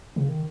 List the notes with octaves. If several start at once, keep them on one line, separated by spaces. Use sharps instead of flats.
C#3
D#3